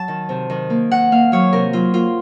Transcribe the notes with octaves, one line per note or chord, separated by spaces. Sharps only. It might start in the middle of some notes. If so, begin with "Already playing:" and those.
Already playing: F#3 A5
D#3
C3
D#3
A#3
D#3 F#5
A#3 F5
F#3 C#5
C3 A#4
F#3 F4
A#3 F4